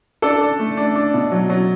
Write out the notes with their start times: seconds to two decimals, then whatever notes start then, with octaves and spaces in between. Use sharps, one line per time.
0.22 D4 A4
0.41 D4
0.59 A3
0.77 D4
0.95 D4
1.14 B2
1.32 F#3
1.50 F#3